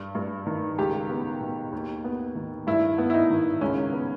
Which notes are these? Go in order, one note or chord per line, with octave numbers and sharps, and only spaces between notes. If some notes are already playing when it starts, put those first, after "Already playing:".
Already playing: G2
G2
D#3
C#2 G4
B3
B2
D#2
B3
D#3
G2 E4
B3
E4
D#4
D#3
C#2 C#4
B3